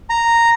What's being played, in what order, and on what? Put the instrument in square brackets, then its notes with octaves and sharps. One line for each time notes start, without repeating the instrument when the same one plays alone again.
[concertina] A#5